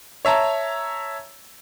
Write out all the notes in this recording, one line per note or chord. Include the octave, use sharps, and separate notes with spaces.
C#5 E5 A5 A#5